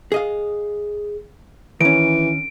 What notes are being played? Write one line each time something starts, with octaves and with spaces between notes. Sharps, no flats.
G#4 D#5 F5
D#3 E3 C#4 D7